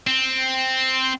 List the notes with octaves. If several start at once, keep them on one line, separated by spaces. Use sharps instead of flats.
C4